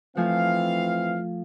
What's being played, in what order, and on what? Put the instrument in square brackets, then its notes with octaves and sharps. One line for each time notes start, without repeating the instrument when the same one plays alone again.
[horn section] E3 C4 F5 [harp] F3 A3 G#5